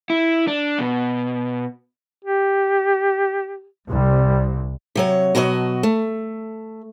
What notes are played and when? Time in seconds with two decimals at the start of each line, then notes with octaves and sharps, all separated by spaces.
0.10 E4
0.48 D4
0.79 B2
2.25 G4
3.88 C2 G3
4.95 C3 F#3 C#5
5.35 B2 F#3 F#4 C5 D#5
5.83 A3